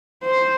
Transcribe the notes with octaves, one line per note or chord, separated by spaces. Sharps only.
C5